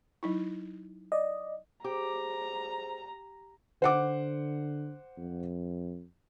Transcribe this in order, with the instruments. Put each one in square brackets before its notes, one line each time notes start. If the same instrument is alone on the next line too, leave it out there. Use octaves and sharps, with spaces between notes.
[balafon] F#3 D#4 E4
[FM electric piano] D5 D#5
[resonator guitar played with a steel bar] G4 [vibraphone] G#4 C5 [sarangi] A#5
[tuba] D3 [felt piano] C5 F#5 D6
[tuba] F2